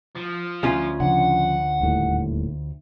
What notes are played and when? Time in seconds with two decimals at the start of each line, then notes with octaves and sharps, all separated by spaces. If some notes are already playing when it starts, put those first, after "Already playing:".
0.15 F3
0.63 D2 C#4 F4
1.00 C#3 F3 D4 F#5
1.81 D#1 D#2 A2